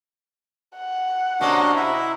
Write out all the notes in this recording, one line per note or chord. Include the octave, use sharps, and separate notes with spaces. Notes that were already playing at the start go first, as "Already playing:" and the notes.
F#5
C3 A#3 C#4 D4 F#4 D#5
E4 E5